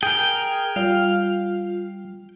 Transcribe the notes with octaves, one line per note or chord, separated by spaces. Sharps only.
G#4 A#4 G5
G3 F4 F5